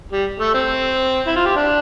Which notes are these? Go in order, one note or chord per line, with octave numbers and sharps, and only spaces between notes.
G3
A3
C4
E4
F4
G4
D4